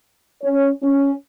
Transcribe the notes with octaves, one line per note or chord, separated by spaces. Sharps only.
C#4 C#5
C#4